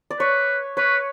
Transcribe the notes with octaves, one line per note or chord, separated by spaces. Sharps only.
D5
B4 C#5
B4 C#5